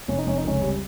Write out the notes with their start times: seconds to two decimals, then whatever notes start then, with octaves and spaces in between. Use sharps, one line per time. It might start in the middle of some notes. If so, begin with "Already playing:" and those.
0.08 F1 C#4
0.19 D#4
0.26 F1 C#4
0.38 D#4
0.44 C#2 C#4
0.62 G3